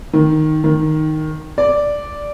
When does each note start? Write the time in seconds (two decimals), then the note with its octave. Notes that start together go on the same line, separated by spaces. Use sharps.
0.13 D#3
0.64 D#3
1.58 D5